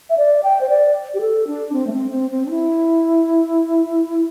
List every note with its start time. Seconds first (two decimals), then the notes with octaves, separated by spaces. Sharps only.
0.10 E5
0.17 D5
0.44 G5
0.61 C5
0.69 D5
1.14 G4
1.21 A4
1.47 D4
1.73 C4
1.87 A3
1.92 C4
2.11 C4
2.31 C4
2.46 D4
2.50 E4